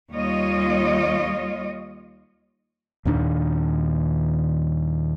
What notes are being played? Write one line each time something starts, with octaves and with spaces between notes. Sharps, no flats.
D#2 G3 F4 C#5 D#5
D#2 A#2 D#3 D4